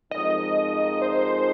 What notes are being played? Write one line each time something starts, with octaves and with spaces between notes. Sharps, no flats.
F2 F3 G#3 D#4 A#4 D#5
C5